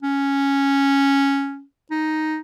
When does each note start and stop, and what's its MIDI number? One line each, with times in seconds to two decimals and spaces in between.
0.03 1.63 61
1.91 2.38 63